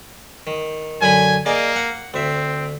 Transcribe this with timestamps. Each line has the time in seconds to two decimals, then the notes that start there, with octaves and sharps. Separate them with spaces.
0.47 D#3
1.01 F#2 D3 G#5 B5
1.46 A#3 G#4 D5 D#5
1.76 F#5
2.14 D2 C4 E5